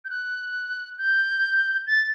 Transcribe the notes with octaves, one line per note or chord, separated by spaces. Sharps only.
G6
F#6
G6
A6